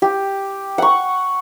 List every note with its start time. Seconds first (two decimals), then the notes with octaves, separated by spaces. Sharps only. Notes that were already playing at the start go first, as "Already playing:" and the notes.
0.02 G4
0.78 F#5 C#6